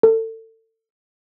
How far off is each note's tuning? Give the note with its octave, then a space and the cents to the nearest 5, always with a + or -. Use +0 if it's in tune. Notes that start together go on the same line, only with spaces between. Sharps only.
A4 +30